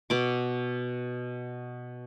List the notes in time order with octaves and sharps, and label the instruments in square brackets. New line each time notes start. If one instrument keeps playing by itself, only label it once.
[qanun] B2 D6